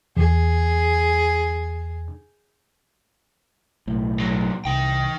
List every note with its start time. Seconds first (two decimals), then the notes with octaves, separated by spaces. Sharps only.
0.17 E2 G#4
3.87 B1 A2
4.20 A#2 F#3
4.65 C2 D#4 G5